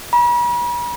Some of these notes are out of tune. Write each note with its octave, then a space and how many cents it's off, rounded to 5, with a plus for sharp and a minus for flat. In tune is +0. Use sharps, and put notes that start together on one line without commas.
B5 -45